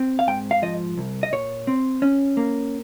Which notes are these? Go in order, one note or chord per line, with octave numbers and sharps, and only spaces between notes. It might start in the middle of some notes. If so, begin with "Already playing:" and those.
Already playing: C4
F5
G#2 G5
F5
F3 D#5
C2
D#5
A#2 C#5
C4
C#4
A#3